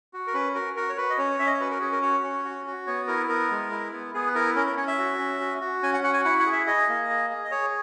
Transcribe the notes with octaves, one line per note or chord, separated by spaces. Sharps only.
F#4
A#4
C#4 B4
F#4 A#4
F#4 A#4
C#5
F#4 B4
D#5
C#4 C#5
C#4 E5
D#5
C#5
F#4 B4
A#4
C#4 G#4
A#4
F#4 C#5
C#4
F#4
F#4
B3 C#5
E4 A#4
B3 A#4
G#3
E4
B3
B3 G#4
B4
E4 A#4
C#4 A#4
A#4
C#4 C#5
E5
F#4
C#4
F#4
F#4
C#4 G#5
F#5
F#4 F#5
G#5
E4 F#5
F#5
G#4
E5
G#4 D#5
A#3
G#4
G#4
D#5
G#4 C#5